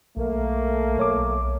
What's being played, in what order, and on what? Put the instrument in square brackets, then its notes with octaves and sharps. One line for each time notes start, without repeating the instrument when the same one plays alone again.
[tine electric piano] B1 [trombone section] A3 A#3
[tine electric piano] B1 C#5 D6